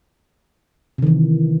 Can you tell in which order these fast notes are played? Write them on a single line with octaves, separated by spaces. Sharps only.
C3 D#3 E3